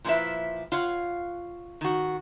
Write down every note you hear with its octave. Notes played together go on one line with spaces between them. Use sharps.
A#2 F3 C#4 E4 B4 E5
F4 C#5 F5 F#5
D#3 F#4